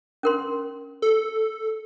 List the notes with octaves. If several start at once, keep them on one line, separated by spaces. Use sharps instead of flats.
C#4 A#4 C6
A4